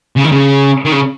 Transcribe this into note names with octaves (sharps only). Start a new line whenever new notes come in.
C#3
D#3
C#3
D#3
C#3